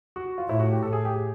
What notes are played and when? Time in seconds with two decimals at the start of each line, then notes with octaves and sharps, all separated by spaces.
0.16 F#4
0.38 F4
0.49 A2 E4
0.59 F#4
0.72 G4
0.82 A2 A4
0.93 G#4
1.05 G4
1.16 G#4